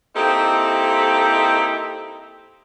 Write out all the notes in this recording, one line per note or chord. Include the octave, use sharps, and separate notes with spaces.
A#3 C4 D#4 E4 G4 A4